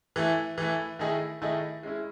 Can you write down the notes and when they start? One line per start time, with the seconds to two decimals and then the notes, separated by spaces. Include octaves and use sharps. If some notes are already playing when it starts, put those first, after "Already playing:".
0.16 E3 A3 E4
0.58 E3 A3 E4
0.99 D#3 A3 E4 G#4 D#5
1.42 D#3 A3 E4 G#4 D#5
1.83 G#3 C#4 E4